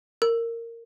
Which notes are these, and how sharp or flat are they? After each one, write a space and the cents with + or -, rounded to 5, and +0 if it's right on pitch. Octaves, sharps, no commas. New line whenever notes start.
A#4 -15